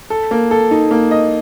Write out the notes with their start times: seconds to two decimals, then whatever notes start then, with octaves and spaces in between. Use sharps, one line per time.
0.10 A4
0.31 A#3
0.51 A4
0.71 D#4
0.91 A#3
1.11 D#5